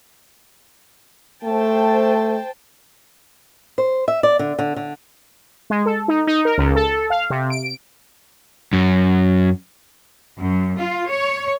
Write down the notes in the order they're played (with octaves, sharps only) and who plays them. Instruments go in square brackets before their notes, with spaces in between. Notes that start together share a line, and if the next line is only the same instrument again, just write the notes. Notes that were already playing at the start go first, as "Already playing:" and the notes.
[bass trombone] A3 [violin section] C5 G5 A5
[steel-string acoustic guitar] C5
E5
D5
D3
D3
D3
[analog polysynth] G#3
A4
D#4
D#4
A#4
C#2
A4
F5
C3
D7
[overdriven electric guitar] F#2
[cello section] F#2
F4
C#5